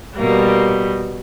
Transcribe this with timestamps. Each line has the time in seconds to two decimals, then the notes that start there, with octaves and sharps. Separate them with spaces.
0.16 B2 G3 A#3